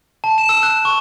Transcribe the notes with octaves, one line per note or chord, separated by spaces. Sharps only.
A5
E7
E6
F#6
C#6